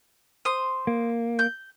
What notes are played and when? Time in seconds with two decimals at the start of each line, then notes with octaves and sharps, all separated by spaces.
0.45 C5 D#6
0.87 A#3
1.39 G6